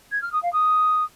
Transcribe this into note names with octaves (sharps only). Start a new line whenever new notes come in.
G#6
F6
D#6
F5
D#6